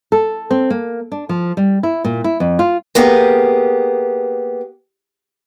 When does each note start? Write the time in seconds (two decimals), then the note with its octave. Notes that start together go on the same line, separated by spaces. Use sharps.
0.12 A4
0.51 C4
0.70 A#3
1.12 D4
1.29 F3
1.57 G3
1.83 E4
2.04 A#2
2.24 E4
2.40 F2
2.59 F4
2.95 A#3 B3 G4 G#4